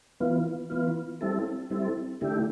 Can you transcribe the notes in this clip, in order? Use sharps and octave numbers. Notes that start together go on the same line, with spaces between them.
E3 B3 F4
E3 B3 F4
G3 C4 E4 A4
G3 C4 E4 A4
D3 A3 E4 G4